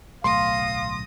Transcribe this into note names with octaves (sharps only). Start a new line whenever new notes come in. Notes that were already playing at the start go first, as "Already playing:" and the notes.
D1 B1 A3 F5 C6 D#6 A#6